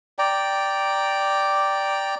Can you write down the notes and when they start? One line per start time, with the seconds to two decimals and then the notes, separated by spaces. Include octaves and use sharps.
0.19 D5 G5 A#5